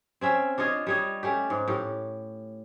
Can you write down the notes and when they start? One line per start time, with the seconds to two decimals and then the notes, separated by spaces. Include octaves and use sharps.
0.21 C4 C#4 E5
0.58 D4 F4 C#5 D#5
0.87 G3 C#5 D#5
1.23 A3 C#4 G4
1.50 G#2
1.68 A2 G4